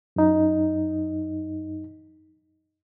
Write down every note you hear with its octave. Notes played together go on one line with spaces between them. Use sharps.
F#2 D#4